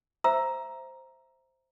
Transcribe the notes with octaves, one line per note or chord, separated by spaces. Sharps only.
C5 E5 A#5 E6